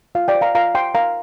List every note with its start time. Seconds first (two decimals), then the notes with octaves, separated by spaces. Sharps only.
0.15 F4 F5
0.28 D5 G5
0.35 C5
0.41 F5 A#5
0.55 F4 F5 A#5
0.75 C5 G5 C6
0.95 A#4 F5 A#5